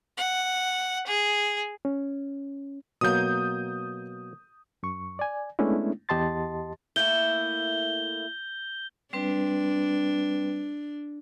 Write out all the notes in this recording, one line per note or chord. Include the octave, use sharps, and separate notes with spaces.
F#5
G#4
C#4
B2 F#3 A#3 D#6 G6
F#2 C#6
D5 G#5
G#3 A3 B3 C#4 D4 E4
E2 G4 D#5 A5 C6 A6
A3 A#3 E4 G6 G7
G3 C4 D4 B4